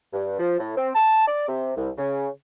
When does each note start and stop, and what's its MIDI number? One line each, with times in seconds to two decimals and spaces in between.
0.13 0.39 43
0.39 0.57 53
0.60 0.77 45
0.77 0.89 60
0.95 1.26 81
1.27 1.48 74
1.48 1.72 48
1.76 1.89 36
1.97 2.27 49